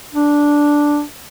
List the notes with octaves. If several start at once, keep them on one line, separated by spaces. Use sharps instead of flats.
D4